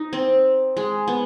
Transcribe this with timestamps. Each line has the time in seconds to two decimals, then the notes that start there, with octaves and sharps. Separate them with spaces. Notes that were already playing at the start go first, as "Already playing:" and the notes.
Already playing: D#4
0.13 C4
0.77 G#3
1.08 B3